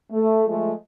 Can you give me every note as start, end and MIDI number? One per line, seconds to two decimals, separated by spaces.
0.11 0.42 57
0.46 0.70 53
0.46 0.70 56
0.46 0.70 57